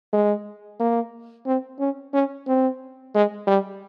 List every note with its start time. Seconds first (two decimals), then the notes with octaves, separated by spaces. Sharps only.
0.13 G#3
0.80 A#3
1.46 C4
1.80 C#4
2.13 C#4
2.47 C4
3.14 G#3
3.47 G3